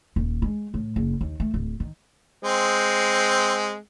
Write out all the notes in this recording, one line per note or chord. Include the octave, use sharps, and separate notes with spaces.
D#1
G#3
A2
F#1
D#2
A3
D1
D#3
G#3 C4